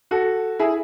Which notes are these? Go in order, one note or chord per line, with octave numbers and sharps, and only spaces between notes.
F#4 A4
E4 G#4